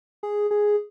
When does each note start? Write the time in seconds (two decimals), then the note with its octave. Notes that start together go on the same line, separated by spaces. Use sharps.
0.23 G#4
0.51 G#4